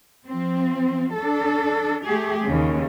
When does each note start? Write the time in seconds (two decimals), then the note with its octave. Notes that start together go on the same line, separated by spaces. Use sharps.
0.27 F3 C4
1.15 D4 A4
2.04 A3 G4 G#4
2.46 D#2 C#3